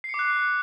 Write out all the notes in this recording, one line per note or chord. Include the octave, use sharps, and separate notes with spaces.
D6 F#6 C7 C#7